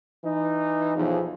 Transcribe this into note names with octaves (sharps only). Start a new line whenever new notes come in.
E3 D#4
B1 E2 F3